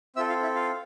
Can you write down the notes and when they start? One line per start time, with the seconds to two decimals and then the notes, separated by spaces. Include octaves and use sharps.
0.16 C4 F4 A4 E5 E6
0.29 F4 F5
0.42 E4 E5
0.55 F4 F5